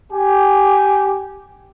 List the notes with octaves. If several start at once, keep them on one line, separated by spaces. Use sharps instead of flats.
G4 G#5